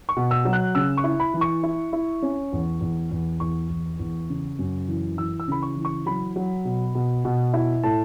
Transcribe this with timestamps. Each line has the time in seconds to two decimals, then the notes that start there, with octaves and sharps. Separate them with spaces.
0.09 C#6
0.16 B2
0.31 E6
0.45 F#3
0.53 F#6
0.75 C#3 E6
0.97 C#6
1.04 E4
1.20 B5
1.34 E3
1.41 C#6
1.63 E4
1.93 E4
2.22 C#4
2.53 E2
2.81 E2
3.11 E2
3.40 E2 C#6
3.69 E2
3.99 E2
4.30 C#3
4.59 F#2
4.88 E3
5.17 E3 E6
5.40 E6
5.48 C#3 B5
5.63 C#6
5.77 E3
5.85 C#6
6.06 F#3 B5
6.36 F#3
6.65 B2
6.95 B2
7.25 B2
7.53 E4
7.83 A2 A5